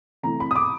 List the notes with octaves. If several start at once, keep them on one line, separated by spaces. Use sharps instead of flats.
C3 E3 A3 A#5
B5
D#6
D6